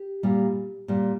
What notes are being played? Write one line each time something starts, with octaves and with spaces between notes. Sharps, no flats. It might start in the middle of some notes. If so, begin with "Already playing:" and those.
Already playing: G4
A#2 G3
A#2 G3